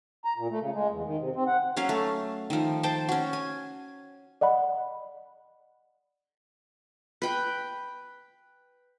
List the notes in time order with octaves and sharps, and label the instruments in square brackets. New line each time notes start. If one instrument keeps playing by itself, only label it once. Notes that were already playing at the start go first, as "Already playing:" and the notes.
[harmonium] A#5
A#2
A3
C#3
G#3
E2
D#3
C3
C4
F#5
[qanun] F#3 C#4 F5
A3
D#3 F3
C5 G5 A5
C#4 F#4
G#5
[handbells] D5 D#5 F#5 B5
[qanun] B4 G5